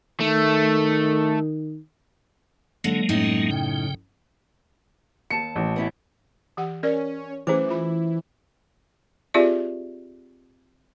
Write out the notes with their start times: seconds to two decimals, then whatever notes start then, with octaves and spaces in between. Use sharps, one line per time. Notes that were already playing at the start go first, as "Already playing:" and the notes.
0.21 D#3 A3
2.84 D3 F#3 G#3 A#3
3.09 F#2 A2 D#4
3.51 C#3 G5
5.30 D#2 A5 C#7
5.56 A1
5.76 B3 C#4 E4
6.57 E3 G4 F#5
6.83 C#4 A#4 D5
7.47 E3 A3 C#4 G#4 C5 D6
7.68 F4 B5
9.34 C4 F4 G4 G#4 D5 E5